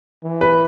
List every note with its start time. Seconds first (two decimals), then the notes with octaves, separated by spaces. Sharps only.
0.24 E3
0.41 B4